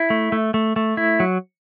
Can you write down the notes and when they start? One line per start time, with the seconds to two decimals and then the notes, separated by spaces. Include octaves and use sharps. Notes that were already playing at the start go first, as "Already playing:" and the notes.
Already playing: E4
0.10 A3
0.32 A3
0.54 A3
0.76 A3
0.97 E4
1.20 F#3